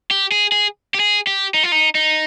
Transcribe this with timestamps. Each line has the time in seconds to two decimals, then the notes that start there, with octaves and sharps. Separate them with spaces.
0.11 G4
0.32 G#4
0.52 G#4
0.94 G4
1.00 G#4
1.27 G4
1.54 D#4
1.63 F4
1.72 D#4
1.95 D#4